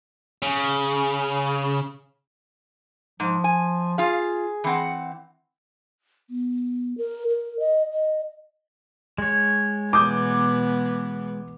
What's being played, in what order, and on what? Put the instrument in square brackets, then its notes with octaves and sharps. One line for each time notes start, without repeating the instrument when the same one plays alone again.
[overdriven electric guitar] C#3
[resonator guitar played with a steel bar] G#2 [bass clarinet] F3
[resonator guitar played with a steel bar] G#5
[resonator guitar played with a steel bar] F4 F5 [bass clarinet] G#4
[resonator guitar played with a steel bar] E3 C4 F#5
[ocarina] B3
A#4
A#4
D#5
D#5
[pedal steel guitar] G#3 C#5
[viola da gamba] B2 E3 B3 [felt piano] D6 D#6 G6